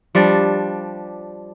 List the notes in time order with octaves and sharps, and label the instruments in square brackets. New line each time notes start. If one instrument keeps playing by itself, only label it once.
[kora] F3 G3 D4